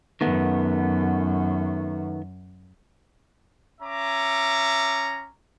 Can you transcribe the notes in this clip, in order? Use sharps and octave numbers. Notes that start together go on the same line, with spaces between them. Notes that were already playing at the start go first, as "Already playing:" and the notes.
F#2 D#3 A3 B3
C#4 E5 A#5 D6